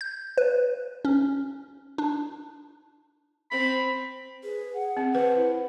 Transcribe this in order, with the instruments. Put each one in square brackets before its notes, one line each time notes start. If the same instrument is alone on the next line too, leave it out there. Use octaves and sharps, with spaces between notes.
[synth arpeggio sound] G6
B4
C#4
D4
[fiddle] C4 [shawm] B5
[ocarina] G#4 [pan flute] B4
[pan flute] F#5
[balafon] C4
[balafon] B4 [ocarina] C5
[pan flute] E4